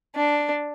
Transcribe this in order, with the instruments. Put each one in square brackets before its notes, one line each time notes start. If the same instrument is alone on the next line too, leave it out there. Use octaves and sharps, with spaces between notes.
[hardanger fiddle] D4